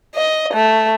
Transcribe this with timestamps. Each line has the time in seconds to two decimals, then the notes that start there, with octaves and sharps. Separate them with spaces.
0.15 D#5
0.53 A3